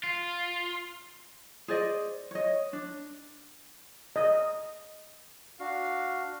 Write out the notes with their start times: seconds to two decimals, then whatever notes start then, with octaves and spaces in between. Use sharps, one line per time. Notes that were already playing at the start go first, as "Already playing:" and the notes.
0.03 F4
1.68 G#4 C5 D5 D#5
2.31 C#5 D#5
2.73 D4
4.16 D#5
5.60 D4 F#4 F5